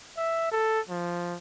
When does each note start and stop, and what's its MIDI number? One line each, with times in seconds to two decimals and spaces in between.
0.17 0.47 76
0.51 0.80 69
0.89 1.36 53